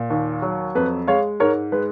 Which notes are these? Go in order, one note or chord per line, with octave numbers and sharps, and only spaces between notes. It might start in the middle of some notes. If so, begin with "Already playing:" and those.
Already playing: A#2
D#2
F#3
F2 B4
G#3 C#5 F5
G#2 A#4 C#5
G#3 B4